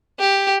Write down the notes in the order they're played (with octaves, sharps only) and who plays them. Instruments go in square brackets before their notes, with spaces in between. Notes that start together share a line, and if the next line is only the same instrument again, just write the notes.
[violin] G4